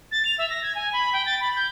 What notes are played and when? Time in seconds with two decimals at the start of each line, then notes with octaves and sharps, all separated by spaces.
0.12 A6
0.25 F7
0.38 E5
0.50 A#6
0.63 G#6
0.75 G#5
0.93 B5
1.13 G5
1.26 A6
1.40 B5
1.55 G6